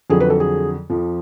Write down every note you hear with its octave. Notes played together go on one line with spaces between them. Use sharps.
F2 D3 F#3 G#4
B4
A4
G#4
F2 F3